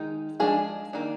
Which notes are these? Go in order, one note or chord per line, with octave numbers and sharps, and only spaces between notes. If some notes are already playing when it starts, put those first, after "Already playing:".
Already playing: D#3 G#3 D#4
F3 G#3 D4 G#4
D#3 A#3 D4